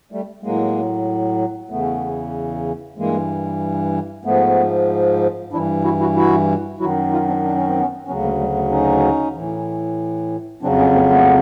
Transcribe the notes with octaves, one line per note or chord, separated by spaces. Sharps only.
G3 A3
A2 F#3 G#3 A#3
E2 C#3 E3 A3 B3
G2 E3 G#3 A#3
G#2 F3 A3 B3
G2 E3 D4 E4
E4 F#4
E4 F#4
E4 F#4
F#2 D#3 F#3 E4 F#4
D#4 F4
C4 D4
D4
C#4
C4
B3 C#4
D2 C#3 F#3 B3 C#4
G#3 A#3
G3 A3
A3 B3
C#4 D#4
A2 E3
F2 C#3 F#3 C4 D4
B3 C#4
A#3 C4
A3 B3